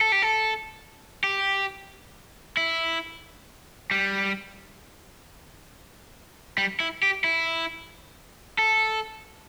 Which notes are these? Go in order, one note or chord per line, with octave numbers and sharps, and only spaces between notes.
A4
G4
A4
G4
E4
G3
G3
E4
G4
E4
A4